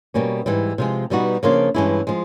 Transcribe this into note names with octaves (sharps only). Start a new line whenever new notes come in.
B2 G3 A#3 C#4
G#2 E3 G3
C3 F3 G#3
B2 G3 B3 D#4 F#4
C#3 F3 A#3 D4 F4
G2 E3 G#3 C#4 E4
F3 G#3